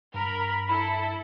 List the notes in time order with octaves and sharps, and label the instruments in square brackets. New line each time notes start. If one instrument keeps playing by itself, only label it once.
[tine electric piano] G2 [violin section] A#4 B5
[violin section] E4 A4 [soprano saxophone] B5